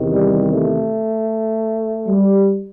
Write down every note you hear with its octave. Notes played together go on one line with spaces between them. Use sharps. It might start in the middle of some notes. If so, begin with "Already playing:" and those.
Already playing: E2 C3 D#3
G3
A3
G3